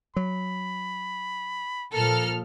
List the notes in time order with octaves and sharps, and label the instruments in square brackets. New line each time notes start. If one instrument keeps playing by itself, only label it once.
[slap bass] F#3 [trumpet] B5
[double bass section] A#2 F3 [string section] A4 F6 [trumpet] A#4